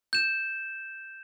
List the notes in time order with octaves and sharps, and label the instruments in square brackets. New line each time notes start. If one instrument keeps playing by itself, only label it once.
[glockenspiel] G6 E7